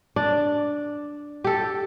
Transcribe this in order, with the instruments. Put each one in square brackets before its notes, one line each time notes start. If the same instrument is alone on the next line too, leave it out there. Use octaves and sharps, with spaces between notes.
[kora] D4 D5
G4 A4